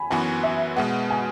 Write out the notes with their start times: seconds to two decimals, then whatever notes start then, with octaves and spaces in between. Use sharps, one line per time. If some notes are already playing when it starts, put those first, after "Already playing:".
Already playing: G#5 B5
0.10 F#2 E3 B3 F#4 G#5
0.43 E5
0.76 B2 G#3 B3 F#5
1.10 G#5